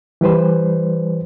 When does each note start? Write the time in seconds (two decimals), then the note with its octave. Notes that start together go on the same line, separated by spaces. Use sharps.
0.21 E3 G3 B4 C5